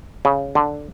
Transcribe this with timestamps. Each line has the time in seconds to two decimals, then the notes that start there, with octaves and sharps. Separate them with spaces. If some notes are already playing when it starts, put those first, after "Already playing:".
0.25 C#3
0.55 D3